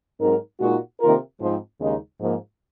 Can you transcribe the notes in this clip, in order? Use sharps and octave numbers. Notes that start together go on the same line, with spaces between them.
G#2 F#3 C4 D#4 A#4
A#2 G#3 D#4 F#4
C3 D#3 A#3 F4 A#4
G#2 F3 C4
D#2 C#3 G#3 D#4
G#2 F3 A#3